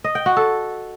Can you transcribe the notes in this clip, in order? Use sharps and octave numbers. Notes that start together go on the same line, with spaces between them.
D#5
G5
F#4
A4